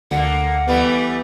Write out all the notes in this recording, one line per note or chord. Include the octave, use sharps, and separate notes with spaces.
D2 D3 A#3 F#5
E3 G3 A3 B3